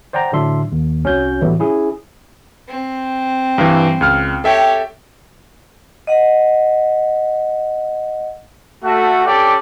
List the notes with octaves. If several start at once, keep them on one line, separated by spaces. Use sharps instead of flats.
C5 D5 F#5 G5 A#5
A2 D3 F#3 D4 E5 C6
D#2
C2 C#4 F#4 C#5 G6
A2 E3 F#3 G3 A3 B3
C#4 E4 G#4
C4
G2 E3
C#2 F6
G4 A4 C#5 E5 G5
D#5 F#5
A3 F#4
C#4 G4 A4 D5